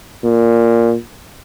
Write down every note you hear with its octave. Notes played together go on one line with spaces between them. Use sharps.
A#2